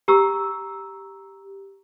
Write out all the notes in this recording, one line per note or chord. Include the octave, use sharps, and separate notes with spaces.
G4 A#5 C#6 E6